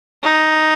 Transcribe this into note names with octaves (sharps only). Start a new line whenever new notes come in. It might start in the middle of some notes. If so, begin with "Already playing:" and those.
D#4